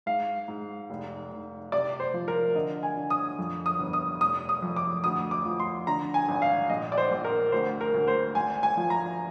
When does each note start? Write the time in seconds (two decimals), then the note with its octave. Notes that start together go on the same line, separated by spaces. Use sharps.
0.06 G#2 F5
0.48 G#2
0.90 F1
1.31 F1
1.72 C3 D5
2.00 C5
2.14 F3
2.28 A#4
2.55 D3 D#5
2.83 G#5
2.97 D3
3.10 D#6
3.39 F2
3.66 D#6
3.79 G1
3.93 D#6
4.21 F1 D#6
4.49 D#6
4.62 F2
4.76 D6
5.04 D2 D#6
5.31 D6
5.45 F3
5.60 C6
5.87 D3 A#5
6.14 G#5
6.29 G#1
6.42 F5
6.69 A#1 D#5
6.92 D5
6.98 C5
7.11 A#1
7.24 A#4
7.52 D2 C5
7.81 A#4
7.94 D2
8.08 C5
8.35 G#1 G#5
8.63 G#5
8.77 F3
8.90 A#5